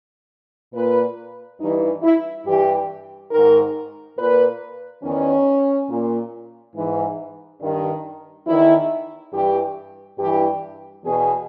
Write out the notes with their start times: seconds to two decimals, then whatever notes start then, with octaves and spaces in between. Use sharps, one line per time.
0.74 A#2 B4
1.60 G2 E3 D#4
2.03 E4
2.46 G2 E3 G4
3.31 G#2 D#3 A#4
4.17 A#2 B4
5.03 E2 D#3 C#4
5.89 A#2
6.75 G#2 E3
7.61 G2 D#3
8.47 E2 D#3 E4
9.32 G2 E3 G4
10.18 G2 E3 G4
11.04 E2 B2 G#4